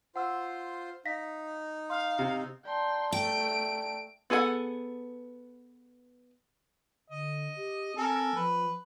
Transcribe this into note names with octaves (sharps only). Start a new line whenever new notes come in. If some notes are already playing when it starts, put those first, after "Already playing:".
F4 C5 F#5 E6
D#4 F5 A#6 B6
F5 C6 F6
C3
D5 G5 A5 A#5 C6
A3 G5 D7
B3 G#4 A4 C5 F#5
D3 D#5
G4
C4 A4 A#4 G#5
F3 B4